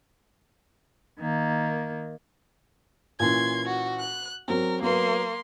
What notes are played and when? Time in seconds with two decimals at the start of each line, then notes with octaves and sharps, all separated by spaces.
1.20 D#3 A#3
3.20 A#2 E3 C#4 C6 G#6
3.65 F#4
4.00 F#6
4.48 F#3 C4 A#4
4.82 F#3 A#3 B3 C6